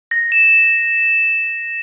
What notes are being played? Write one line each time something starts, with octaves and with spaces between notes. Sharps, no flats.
A#6
E7